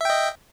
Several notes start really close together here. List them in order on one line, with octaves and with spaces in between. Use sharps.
E5 G5 D#5